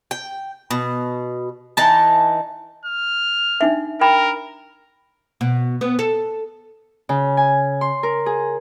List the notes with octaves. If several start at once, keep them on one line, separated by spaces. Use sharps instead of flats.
G5
B2
E3 D#4 A5
F6
D4 D#4 E5
A#4 G5 B5
B2
B3
A4
C#3
G#5
C6
A#4
G#4